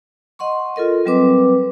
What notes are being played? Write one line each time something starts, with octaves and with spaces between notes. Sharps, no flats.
D#5 F#5 C6 C#6
F4 A4 A#4 D#5
F#3 G3 C4 B4 D6